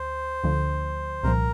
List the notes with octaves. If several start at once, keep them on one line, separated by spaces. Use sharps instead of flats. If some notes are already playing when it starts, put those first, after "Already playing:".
Already playing: D2 C5
D2 D3 F3
C2 A#2 F3 A#4